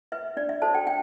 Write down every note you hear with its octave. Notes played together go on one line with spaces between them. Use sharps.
B4 E5
D4 D5
E5
F#4 A4 C5 A5
G5
D4 G5